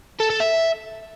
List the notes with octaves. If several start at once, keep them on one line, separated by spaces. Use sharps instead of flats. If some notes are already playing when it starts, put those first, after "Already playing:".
A4
A4
E5